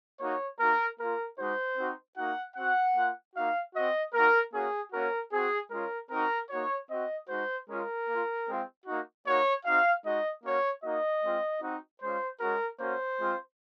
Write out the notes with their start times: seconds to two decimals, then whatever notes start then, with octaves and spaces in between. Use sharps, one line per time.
0.20 A#3 D#4 F#4 C#5
0.59 A#3 D#4 F#4 A#4
0.99 A#3 F4 A#4
1.38 G#3 D#4 F#4 C5
1.77 C4 D#4 F#4
2.17 A#3 D#4 F#4 F#5
2.56 C4 F#4 F#5
2.95 A#3 F4
3.35 A#3 D#4 F#4 F5
3.74 C4 F#4 D#5
4.13 A#3 D#4 F#4 A#4
4.53 A#3 C#4 F#4 G#4
4.92 A#3 C#4 F#4 A#4
5.32 C4 F#4 G#4
5.71 G#3 C#4 F4 A#4
6.11 C4 D#4 F#4 A#4
6.50 A#3 D#4 F#4 C#5
6.89 C4 F#4 D#5
7.29 G#3 D#4 F#4 C5
7.68 G#3 C#4 F4 A#4
8.07 A#3 F4
8.47 G#3 C4 F4
8.86 A#3 D#4 F#4
9.26 A#3 D#4 F#4 C#5
9.64 C4 D#4 F#4 F5
10.04 G#3 D#4 F#4 D#5
10.43 A#3 C#4 F#4 C#5
10.83 A#3 D#4 F#4 D#5
11.23 G#3 C4 F4
11.62 C4 D#4 F#4
12.01 G#3 C#4 F4 C5
12.40 G#3 C#4 F#4 A#4
12.80 A#3 C#4 F#4 C5
13.19 G#3 C4 F4